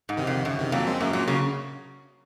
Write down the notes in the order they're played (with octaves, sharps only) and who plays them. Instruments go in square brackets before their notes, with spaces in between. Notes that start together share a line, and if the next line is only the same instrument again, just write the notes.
[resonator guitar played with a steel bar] G#2
[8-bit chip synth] C3 D#3
[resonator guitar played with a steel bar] F2
[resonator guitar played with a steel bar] F#2 [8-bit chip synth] C#3
[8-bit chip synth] C3 D#3
[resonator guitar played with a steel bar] F2 [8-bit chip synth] F#3 A#3
[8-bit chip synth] G#3 C4
[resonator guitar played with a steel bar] F#2 [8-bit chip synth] F#3 A#3
[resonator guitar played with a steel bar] A#2 [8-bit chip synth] F#3 A#3
[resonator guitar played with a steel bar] C#3 [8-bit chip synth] F#3 A#3